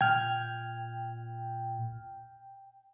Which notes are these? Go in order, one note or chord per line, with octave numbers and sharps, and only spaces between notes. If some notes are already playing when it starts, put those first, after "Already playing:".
A#2 G5 F6 G#6